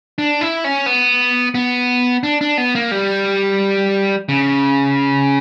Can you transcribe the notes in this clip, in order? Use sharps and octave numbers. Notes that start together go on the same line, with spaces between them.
D4
E4
C#4
B3
B3
D4
D4
B3
A#3
G3
C#3